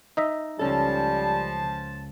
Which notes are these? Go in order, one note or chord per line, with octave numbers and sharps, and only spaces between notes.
D#4 D#5 E5
C#2 F3 G3 C#4 A4 A5